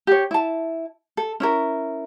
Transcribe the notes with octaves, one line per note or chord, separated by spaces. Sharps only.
G4 C#5
E4 A5
A4
C#4 E4 A#4